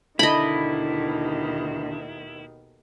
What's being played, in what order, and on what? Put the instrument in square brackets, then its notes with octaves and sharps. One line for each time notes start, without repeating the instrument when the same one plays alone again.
[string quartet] D#2 B2 D#3 [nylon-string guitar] D3 [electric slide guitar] E4 [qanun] D#5 B5